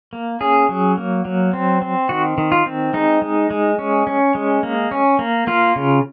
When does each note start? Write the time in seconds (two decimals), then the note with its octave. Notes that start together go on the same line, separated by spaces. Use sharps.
0.13 A#3
0.40 C#4 G#4
0.69 F#3
0.98 A#3
1.25 F#3
1.53 C4
1.82 C4
2.09 D#3 F#4
2.38 D#3
2.52 F4
2.66 C4
2.94 G#3 D#4
3.22 G#3
3.51 G#3
3.79 C#4
4.07 C#4
4.35 G#3
4.63 A#3
4.91 C#4
5.19 A#3
5.47 A#3 F4
5.76 C#3